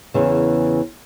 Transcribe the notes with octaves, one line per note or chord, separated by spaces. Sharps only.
E2 C#3 E3